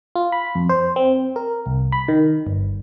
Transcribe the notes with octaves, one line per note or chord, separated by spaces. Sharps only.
F4
B5
F2
C5
C4
A#4
C2
B5
D#3
G1